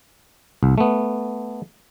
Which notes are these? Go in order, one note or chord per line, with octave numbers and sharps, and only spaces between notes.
C2
A3 B3